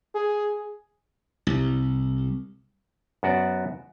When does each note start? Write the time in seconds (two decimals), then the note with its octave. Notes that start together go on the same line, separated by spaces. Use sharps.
0.15 G#4
1.47 C2
3.23 F#2 B3 F#4 D5